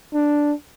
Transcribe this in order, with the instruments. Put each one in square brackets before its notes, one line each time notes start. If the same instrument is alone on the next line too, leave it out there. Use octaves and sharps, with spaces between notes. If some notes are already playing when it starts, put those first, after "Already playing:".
[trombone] D4